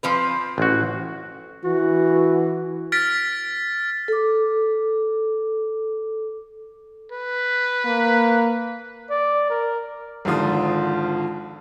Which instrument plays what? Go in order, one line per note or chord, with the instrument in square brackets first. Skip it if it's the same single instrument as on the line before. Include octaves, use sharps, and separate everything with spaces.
[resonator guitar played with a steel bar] F3 C4 B4
[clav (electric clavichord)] A1 F#4
[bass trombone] E3 [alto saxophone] F#4
[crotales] F6 A6 B6 D7
[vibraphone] A4 D6
[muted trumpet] B4
[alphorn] A#3
[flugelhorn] D5
A#4
[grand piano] G#1 D3 F3 F4 D#6